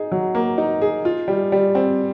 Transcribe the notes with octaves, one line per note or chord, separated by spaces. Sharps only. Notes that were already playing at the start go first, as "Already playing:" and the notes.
Already playing: D#4 G#4
F#3
A#3
D#4
G#4
F4
G3
G3
C4